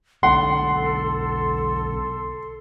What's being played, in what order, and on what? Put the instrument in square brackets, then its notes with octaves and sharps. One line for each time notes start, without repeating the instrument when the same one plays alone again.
[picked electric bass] B1 B2 D3 [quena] A4 [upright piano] F#5 [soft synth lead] C6